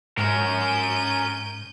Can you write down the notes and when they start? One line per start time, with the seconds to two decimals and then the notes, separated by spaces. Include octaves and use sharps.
0.17 G#2 C#4 A#4 G6 D#7